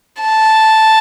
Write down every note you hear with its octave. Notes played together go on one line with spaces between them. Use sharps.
A5